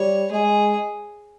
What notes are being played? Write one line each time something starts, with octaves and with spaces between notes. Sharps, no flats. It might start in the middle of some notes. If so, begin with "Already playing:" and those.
Already playing: G3 C#5
G#3 G#4